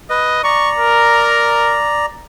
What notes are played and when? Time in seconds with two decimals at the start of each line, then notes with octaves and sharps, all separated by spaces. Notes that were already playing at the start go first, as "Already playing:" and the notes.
0.10 B4 D#5
0.44 D5 A#5 C#6
0.78 A#4